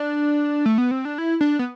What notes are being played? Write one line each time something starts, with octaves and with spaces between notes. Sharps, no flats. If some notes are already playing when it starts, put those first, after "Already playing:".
Already playing: D4
A3
B3
C4
D4
E4
D4
B3